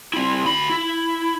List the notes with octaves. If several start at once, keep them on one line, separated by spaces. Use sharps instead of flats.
C4 E4
D2 B5
E4